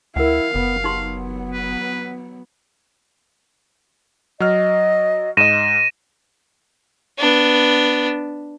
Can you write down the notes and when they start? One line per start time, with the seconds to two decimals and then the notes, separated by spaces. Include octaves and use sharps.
0.16 D2 E4 A#4 F5 F#5
0.55 F#1 B3
0.84 F#3 B3 D#4 G4 C6
1.53 B4
4.40 F#3 D#5 F6
5.37 G#2 D#5 A#6 D#7 E7
7.18 B3 D4